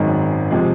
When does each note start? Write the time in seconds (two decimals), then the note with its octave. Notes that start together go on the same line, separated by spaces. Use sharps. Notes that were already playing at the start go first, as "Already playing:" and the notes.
Already playing: G#1 F#2 D#3 G#3
0.51 C3 F3 G#3